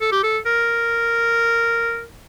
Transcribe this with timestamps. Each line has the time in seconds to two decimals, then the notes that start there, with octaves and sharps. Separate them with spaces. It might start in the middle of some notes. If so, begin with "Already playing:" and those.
0.01 A4
0.12 G4
0.23 A4
0.46 A#4